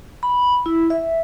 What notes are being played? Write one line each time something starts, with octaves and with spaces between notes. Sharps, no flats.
B5
E4
E5